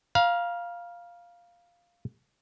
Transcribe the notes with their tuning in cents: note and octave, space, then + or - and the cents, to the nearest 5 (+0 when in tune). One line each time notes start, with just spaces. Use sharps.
F5 +0 A#5 +40